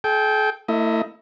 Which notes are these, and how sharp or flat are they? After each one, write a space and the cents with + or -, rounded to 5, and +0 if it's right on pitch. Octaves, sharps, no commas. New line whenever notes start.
A4 -45 G5 +0
A3 +40 E4 +0 D#5 +20